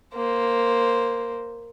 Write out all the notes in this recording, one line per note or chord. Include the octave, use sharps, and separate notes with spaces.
A#3 C5